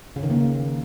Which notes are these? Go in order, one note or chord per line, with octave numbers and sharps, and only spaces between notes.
C#3
D#3
A#3